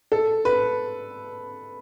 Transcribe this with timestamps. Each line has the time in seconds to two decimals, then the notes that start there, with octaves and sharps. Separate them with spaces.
0.12 A4
0.45 B4